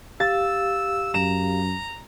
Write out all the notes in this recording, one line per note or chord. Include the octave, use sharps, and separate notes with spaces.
G4 F5 E6 A6
F#2 A#5 E7